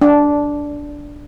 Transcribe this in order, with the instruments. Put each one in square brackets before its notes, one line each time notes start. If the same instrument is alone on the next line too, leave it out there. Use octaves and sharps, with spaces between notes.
[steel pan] D4